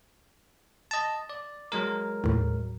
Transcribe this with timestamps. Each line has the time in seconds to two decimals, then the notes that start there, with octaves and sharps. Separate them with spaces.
0.91 D#5 A5
1.30 D5
1.72 F#3 G#3 A#4
2.24 D#2 A2